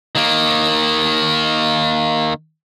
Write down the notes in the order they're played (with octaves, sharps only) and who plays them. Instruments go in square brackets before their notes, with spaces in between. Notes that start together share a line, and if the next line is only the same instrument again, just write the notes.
[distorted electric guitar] D#3 A#3